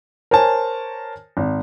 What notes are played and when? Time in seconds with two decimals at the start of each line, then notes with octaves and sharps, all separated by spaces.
0.31 A#4 C5 C#5 G#5 A5
1.37 G#1